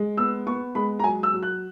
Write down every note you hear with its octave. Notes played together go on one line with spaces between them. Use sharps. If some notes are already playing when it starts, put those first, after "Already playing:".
Already playing: G#3
B3 E6
B3 C#6
G#3 B5
A#5
F#3 G#5
E6
F#3
F#6